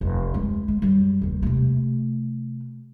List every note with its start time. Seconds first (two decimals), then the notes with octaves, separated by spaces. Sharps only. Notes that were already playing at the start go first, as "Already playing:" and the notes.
0.01 F1 E2
0.34 D2 G#3
0.68 G#3
0.82 F#2 G3
1.21 F1 D#2
1.43 C3 A3